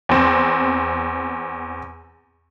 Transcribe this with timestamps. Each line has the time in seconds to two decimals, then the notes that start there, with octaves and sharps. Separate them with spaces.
0.09 E2 C4